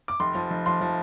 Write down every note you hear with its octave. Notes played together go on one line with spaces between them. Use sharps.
D6
F1 C6
F3
F1
F3 C6
F3